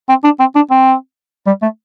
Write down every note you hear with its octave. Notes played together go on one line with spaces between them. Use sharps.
C4
D4
C4
D4
C4
G3
A3